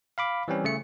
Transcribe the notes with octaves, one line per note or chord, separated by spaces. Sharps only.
F5 B5 D6
E3 G3 C4 C#4
C#3 A3 C#7